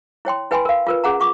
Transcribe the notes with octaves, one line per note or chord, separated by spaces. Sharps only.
E4 C#5 G5 C6
E4 B4 G5 G#5 B5 C6
A#4 F5
F4 A#4 B4
C#4 G#4 F#5 A#5
F4 C#6 D6